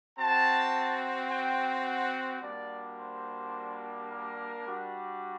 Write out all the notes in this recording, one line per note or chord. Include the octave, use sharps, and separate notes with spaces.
C4 F#4 A5
G5
F#5
G3 A#3 D4 F#4 D5
C5
A#4
G3 D4 F#4